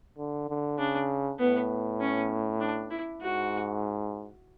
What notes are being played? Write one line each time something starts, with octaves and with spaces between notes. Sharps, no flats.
D3
D3
C#3 D4
A2 B3
C#4
D4
E4
G#2 F#4